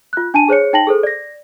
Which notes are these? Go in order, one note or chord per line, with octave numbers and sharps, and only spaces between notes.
F4 F#6
D4 G#5 A5 D#7
G#4 C5 C#5 C#7
D#4 G5 A5 A#6 F#7
G#4 A4 C5
D5 A#6